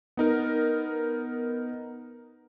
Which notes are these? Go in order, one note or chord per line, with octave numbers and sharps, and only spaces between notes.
B3 D#4 A#4